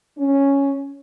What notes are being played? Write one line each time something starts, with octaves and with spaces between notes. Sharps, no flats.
C#4